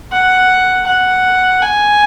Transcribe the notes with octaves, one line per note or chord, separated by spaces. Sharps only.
F#5
F#5
G#5